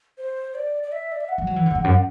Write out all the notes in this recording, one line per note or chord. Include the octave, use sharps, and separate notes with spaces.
C5
D5
D5
E5
D5
E5
F#5
G3
F#3
E3
D3
F#2
E2
F#2